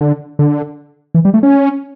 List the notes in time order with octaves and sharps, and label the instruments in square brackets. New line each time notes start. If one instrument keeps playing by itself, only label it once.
[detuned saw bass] D3
D3
E3
G3
A3
C#4